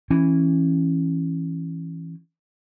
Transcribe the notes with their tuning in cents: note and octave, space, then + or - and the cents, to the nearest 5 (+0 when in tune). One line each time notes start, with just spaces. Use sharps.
E3 +0 C#4 -25